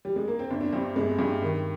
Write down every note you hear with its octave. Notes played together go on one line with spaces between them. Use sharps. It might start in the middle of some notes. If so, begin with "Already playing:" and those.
G3
G#3
A#3
C4
G1 D4
D4
G2 C4
G1 G#3
G2
D#3